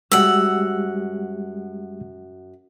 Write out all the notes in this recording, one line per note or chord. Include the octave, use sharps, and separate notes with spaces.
F#2 G3 G#3 G4 F#5 E6